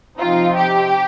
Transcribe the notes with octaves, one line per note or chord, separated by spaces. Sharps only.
C3 F3 C4 D#4 F4
G4